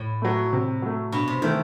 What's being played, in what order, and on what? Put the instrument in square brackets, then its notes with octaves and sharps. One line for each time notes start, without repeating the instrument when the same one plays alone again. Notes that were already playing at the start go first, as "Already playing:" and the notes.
Already playing: [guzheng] A2
[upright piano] F#3 A3
C3
F#3 A3
[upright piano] G2 [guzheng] B2
[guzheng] C3
[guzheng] D#3 [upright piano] E3 A3